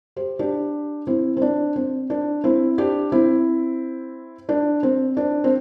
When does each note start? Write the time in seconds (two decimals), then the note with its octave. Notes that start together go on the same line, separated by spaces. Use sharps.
0.16 G4 C5
0.39 D4 G4
1.07 C4 E4
1.37 C4
1.42 D4
1.76 C4
2.10 D4
2.44 C4 E4
2.78 D4 G4
3.12 C4 E4
4.49 D4
4.83 C4
5.17 D4
5.44 C4